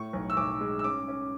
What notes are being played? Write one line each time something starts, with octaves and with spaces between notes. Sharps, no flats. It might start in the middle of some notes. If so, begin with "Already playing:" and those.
Already playing: A2 C#6
B1
E6
B1 D6
G#3
E6
C#4 D6
C#4